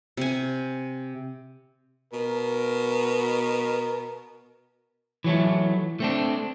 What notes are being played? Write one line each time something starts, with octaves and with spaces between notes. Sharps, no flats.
C3 G#5
B2 A#4
E3 F#3 A3
A3 C4 D4